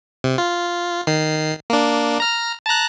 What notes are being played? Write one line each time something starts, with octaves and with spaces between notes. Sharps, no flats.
C3
F4
D#3 C7
A#3 D4
A#5 F6
A5 A#5 F#6